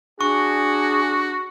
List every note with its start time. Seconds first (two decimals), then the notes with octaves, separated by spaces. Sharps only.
0.21 D4 F#4 G#4 C#6